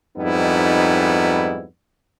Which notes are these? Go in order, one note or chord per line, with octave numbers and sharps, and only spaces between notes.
F2 G#2 G3 B3 D#4 E4